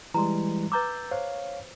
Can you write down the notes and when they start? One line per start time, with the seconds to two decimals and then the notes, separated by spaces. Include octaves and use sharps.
0.14 E3 G3 G#3 A#5 C6
0.72 B4 A#5 D6 E6 G6 A6
1.11 C5 C#5 F5